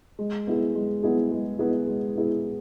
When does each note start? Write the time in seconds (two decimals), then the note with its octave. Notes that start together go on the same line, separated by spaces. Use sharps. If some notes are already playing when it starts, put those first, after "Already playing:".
0.19 G#3
0.47 B3 E4 G#4
0.75 G#3
1.03 B3 E4 G#4
1.32 G#3
1.59 B3 E4 G#4
1.87 G#3
2.16 B3 E4 G#4